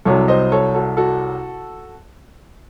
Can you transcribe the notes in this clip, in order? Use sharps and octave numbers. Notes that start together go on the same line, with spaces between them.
C2 C3 F#3 A4 C#5
C5 D#5
A4 C#5
F#4 A4
F#4 A4